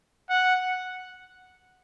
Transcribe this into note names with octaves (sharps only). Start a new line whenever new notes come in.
F#5